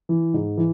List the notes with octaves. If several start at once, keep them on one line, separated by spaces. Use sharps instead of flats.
E3
G#2
E3